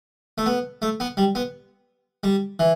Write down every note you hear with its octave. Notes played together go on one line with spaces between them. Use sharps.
A3
B3
A3
B3
G3
B3
G3
E3